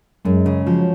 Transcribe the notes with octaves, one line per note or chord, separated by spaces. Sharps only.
F#2 G#3
C#3
F3 F#3